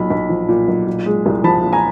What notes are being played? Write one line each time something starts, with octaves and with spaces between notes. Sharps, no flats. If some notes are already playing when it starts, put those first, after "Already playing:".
Already playing: B1 A#2 B5
B1
F3
A#2
B1
A#2
G#3
C2
F3 A5 B5
A#2
G#5 A#5